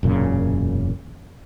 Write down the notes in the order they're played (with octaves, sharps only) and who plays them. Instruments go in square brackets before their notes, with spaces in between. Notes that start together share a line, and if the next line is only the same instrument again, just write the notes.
[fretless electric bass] E1 F#2 A#2 C#3